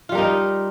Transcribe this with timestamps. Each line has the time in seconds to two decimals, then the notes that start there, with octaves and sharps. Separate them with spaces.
0.09 F4
0.12 G3
0.15 A#4
0.18 D#4